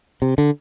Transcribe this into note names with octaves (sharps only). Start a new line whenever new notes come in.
C3
D3